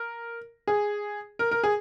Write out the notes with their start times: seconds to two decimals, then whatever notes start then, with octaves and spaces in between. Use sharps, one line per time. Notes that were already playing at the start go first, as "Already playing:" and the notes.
Already playing: A#4
0.67 G#4
1.39 A#4
1.51 A#4
1.64 G#4